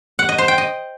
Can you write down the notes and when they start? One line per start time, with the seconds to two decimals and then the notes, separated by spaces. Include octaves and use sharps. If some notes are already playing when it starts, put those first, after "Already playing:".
0.19 F#5
0.29 D#5
0.38 C5
0.48 G5
0.58 D#5